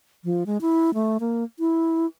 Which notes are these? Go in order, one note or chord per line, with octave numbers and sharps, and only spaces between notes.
F3
G#3
E4
A3
A#3
E4